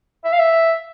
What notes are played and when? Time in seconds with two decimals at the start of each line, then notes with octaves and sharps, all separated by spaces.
0.25 E5
0.33 F5
0.39 E5